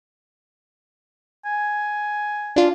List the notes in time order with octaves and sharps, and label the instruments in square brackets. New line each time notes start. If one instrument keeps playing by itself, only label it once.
[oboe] G#5
[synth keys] D4 F4